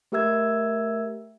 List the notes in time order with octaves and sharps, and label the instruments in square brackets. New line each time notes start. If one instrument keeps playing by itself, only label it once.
[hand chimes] A3 G4 A#4 E5 E6 G#6